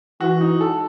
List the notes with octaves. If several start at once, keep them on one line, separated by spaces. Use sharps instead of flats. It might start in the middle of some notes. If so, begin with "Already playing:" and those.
E3 F#4
D#4
A4